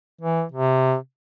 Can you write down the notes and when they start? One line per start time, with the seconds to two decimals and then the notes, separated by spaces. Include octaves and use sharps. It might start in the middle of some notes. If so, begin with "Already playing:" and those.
0.21 E3
0.52 C3